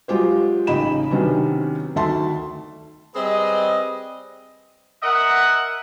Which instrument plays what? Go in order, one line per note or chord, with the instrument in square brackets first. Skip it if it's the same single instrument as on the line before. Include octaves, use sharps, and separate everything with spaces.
[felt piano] F#3 G#3 F4 G4 C5
A1 C#3 D#4 D#5 B5 E7
C3 D#3 F#3 B3 C#4 D4
D2 D#3 E5 A5 C6
[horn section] G3 C4 G#4 B4 D#5
A#4 D#5 E5 F#5